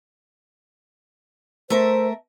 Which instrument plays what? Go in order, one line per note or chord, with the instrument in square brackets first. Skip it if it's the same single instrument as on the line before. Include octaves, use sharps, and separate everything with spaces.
[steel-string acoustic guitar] A3 A#4 E5 [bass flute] C5